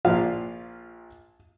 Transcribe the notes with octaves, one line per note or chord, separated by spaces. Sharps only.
A#1 A#2 F3 F5